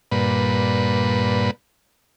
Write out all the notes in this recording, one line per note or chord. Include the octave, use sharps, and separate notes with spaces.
G2 A#2 B4